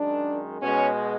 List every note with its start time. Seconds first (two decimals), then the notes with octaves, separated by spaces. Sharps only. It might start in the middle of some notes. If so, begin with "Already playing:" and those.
Already playing: F#2 D#3 G#3 D4
0.61 B2 G#3 C#4